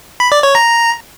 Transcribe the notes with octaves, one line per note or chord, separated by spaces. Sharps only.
B5
D5
C#5
A#5